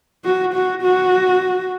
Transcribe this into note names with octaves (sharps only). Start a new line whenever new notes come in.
F#4
F#4
F#4